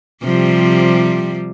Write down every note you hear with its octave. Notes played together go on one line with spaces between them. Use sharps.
C3 F3 G3